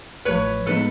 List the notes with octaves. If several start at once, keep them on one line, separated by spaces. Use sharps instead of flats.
A1 A2 F3 B4 C#5
A2 F3 G#3 B3 D#4 A4 B4